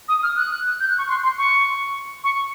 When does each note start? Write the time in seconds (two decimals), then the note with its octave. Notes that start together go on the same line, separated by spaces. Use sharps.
0.09 D#6
0.23 F6
0.37 F#6
0.80 G6
0.89 F#6
0.98 C#6
1.08 C6
1.23 C6
1.38 C#6
2.24 C#6